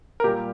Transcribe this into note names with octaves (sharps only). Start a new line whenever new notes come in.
A#4
A#2 G3 G4